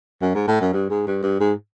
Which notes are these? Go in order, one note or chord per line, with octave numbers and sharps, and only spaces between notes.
F#2
G#2
A2
F#2
G2
G#2
G2
G2
G#2